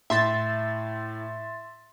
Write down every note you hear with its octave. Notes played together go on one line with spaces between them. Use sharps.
A2 E5 C6 A6